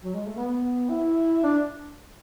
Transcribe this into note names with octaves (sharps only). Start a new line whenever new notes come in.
F#3
G#3
A3
B3
E4
D4